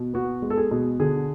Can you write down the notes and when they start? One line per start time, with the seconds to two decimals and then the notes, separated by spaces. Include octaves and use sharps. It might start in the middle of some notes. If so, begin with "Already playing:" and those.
Already playing: B2
0.13 B3 F#4
0.42 G#3
0.50 A4
0.57 G#4
0.71 B2
0.99 D3 G#4